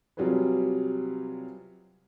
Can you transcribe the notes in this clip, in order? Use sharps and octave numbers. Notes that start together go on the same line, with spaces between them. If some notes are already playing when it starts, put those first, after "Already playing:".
C3 F#3 G3 F4 G#4 B4